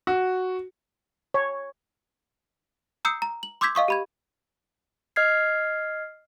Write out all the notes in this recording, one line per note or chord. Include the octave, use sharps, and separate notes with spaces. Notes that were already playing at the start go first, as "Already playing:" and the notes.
F#4
C#5
A#5 D#6 E6 G6 C7 C#7
A#5
F#7
C6 D6 E6 G6 G#6 B6
D#5 F5 C#6 D#6
G4 B5 G#6
D#5 F6 G#6 C7